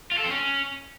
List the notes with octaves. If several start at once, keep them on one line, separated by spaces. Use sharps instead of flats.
F4
A4
C4
C#4